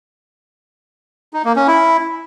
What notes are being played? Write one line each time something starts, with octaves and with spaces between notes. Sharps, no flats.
D#4
A#3
C#4
E4